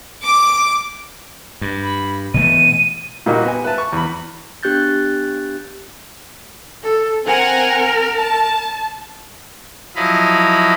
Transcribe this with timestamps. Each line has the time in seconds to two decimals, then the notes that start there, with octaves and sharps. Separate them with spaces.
0.24 D6
1.61 G2
1.82 B5
2.34 B2 E3 A3 D#7
3.26 A#2 G3 A#3 D#4 F#4
3.44 B3 G#5
3.64 B4 E5 A5
3.78 C#6
3.93 E2 B5
4.63 B3 D4 G4 F#6 G6 A6
6.83 A4
7.26 C4 A#4 F#5 G#5
8.18 A5
9.95 F3 F#3 E4 D#5 F5 B5